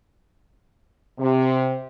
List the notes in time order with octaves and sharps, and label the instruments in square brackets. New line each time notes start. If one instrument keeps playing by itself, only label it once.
[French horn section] C3